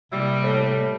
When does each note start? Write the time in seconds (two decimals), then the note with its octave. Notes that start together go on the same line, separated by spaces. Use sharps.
0.12 C3 G3 A#3 E4
0.43 A2